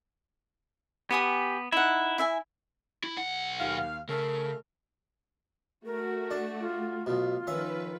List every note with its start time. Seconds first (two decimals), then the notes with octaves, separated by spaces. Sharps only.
1.11 B3 G4 G#5 D#6
1.72 D#4 E4 F#5
2.18 E4 E5 G#5
3.04 E4
3.17 B1 F#5
3.60 D#2 F5
4.09 C#3 A3 A#4
5.85 A3 F#4 A#4
6.31 D4
6.60 F4
7.06 B1 B2 F4
7.47 D#3 F3 C#4 B4 E5